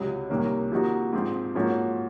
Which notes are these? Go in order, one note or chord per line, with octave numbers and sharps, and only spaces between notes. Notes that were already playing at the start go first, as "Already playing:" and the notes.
Already playing: C#2 C3 F#3
C2 C3 D#3 A#3 C#4
C3 F3 A#3 D#4 F#4
G#2 F3 C4
G#2 F3 A#3 C#4 F#4